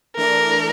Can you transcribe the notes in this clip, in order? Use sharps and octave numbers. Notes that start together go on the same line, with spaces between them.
E3 A3 D4 A4 A#4 D5